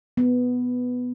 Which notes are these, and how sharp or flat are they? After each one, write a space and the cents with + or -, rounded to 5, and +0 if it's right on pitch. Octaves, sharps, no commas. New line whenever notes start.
B3 +5